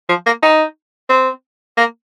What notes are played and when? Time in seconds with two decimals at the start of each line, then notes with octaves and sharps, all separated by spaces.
0.09 F3
0.26 A#3
0.43 D#4
1.09 C4
1.77 A#3